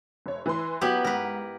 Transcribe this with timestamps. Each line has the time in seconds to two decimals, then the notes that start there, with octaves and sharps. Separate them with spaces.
0.26 F1 C#5
0.46 E3 B4 C6
0.81 F#3 B3 E4 F#4 G4
1.04 G#2 A#4 B4